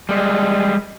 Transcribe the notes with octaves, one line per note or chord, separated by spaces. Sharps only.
G3 G#3